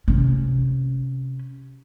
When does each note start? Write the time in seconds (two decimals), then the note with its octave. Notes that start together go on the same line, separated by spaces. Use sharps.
0.08 C3 C#4